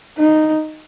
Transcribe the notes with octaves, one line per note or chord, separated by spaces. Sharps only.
D#4